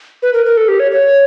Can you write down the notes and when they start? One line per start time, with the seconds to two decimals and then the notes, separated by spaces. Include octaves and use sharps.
0.22 B4
0.34 A#4
0.46 A#4
0.57 A4
0.68 G4
0.80 C#5
0.92 C#5